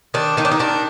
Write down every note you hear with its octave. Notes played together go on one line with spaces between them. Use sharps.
D#3 D4
D#3 D#4
D4
D#4
D#3 D4